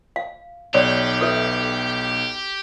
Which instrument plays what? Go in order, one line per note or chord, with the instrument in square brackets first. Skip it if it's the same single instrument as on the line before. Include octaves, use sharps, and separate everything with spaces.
[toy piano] F5
[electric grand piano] B1 [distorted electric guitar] G4 [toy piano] C#5 D5
[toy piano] A4 B4 E5